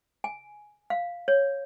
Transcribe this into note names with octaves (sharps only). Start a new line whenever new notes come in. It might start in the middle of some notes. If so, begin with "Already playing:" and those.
G#5
F5
C#5